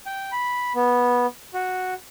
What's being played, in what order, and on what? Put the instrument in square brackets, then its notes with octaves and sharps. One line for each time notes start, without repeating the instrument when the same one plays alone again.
[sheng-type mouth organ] G5
B5
B3
F#4